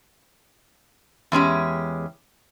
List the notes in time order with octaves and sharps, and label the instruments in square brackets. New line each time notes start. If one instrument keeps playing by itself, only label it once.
[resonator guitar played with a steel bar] E2 G#3 C#4 G4